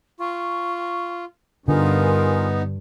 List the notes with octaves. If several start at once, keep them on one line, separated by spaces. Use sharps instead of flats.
F4 C#6
G2 D3 B3 D#4 F4 A#4 G#5